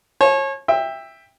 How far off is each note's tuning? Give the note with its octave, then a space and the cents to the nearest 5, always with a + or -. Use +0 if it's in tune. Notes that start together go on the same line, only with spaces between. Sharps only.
C#5 -30 A5 -45
E5 +0 G5 +20